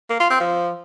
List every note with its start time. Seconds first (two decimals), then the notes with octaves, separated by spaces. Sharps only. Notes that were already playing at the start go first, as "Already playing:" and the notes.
0.10 A#3
0.20 F4
0.30 C4
0.40 F3